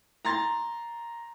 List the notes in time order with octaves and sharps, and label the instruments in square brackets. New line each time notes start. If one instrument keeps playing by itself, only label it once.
[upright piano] A#5 C6 A6